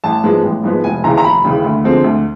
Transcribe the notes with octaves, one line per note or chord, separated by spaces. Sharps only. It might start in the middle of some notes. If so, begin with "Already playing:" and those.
A1 A5
G#2 F3 G#3 B3
A1
G#2 F3 G#3 B3
F1 G#5
D#2 C#3 E3 A#5
A#5
F1 B5
D#2 C#3 E3
D2
D3 F3 G#3 C4
D2